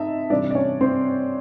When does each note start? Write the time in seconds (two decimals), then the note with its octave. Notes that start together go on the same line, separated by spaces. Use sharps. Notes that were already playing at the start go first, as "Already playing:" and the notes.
Already playing: C3 D#4 D#5 E5 A5
0.30 C3 E3 G3 D4 D5
0.51 D5
0.55 C#4 C#5
0.81 C4 C5